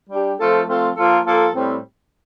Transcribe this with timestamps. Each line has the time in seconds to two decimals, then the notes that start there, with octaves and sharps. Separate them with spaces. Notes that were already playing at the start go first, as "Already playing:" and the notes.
0.10 G3 D4 G4
0.39 F3 A3 C4 F4 A4
0.68 F3 A3 C4 F4 A4
0.97 F3 A#3 F4 A4
1.26 F3 A#3 F4 A4
1.54 A2 G3 C4